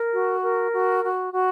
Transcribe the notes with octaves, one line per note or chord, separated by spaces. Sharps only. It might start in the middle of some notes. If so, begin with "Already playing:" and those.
Already playing: A#4
F#4
A#4
F#4
F#4
F#4